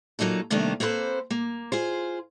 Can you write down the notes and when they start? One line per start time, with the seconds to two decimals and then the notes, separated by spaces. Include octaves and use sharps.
0.19 A#2 F#3 A#3 D#4 A4
0.50 C3 D#3 G3 A3 A#3 D4
0.80 A#3 C4 A4 B4 C5
1.31 A#3
1.72 F4 G#4 C5